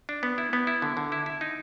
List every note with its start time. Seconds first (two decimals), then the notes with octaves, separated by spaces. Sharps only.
0.09 D4
0.23 B3
0.38 E4
0.53 B3
0.67 E4
0.82 D3
0.97 D3
1.12 E4
1.26 E4
1.41 D#4